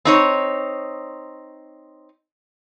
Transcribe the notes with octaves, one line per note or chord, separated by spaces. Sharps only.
C4 D#4 C#5